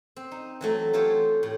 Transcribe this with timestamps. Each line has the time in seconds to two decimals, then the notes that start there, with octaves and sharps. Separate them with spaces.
0.16 C4
0.31 D#4
0.61 E3 F#3 A3
0.93 E3 A3 F4 G4 C5 C#5
1.43 A2